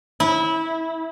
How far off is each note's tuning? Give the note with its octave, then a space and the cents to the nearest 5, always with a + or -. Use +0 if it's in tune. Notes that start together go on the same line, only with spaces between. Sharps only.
E4 -25